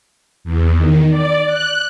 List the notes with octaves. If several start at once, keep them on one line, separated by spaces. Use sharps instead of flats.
E2
D#3
D5
F#6